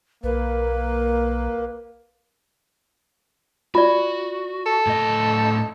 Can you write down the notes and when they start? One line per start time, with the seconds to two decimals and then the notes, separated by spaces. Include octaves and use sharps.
0.24 B1 A#3 B4
3.75 F4 F#4 D5
4.66 A4
4.87 A2 D#5